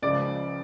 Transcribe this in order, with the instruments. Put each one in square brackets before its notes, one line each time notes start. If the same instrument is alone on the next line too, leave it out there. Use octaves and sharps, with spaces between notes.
[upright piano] C#2 C#3 F3 D5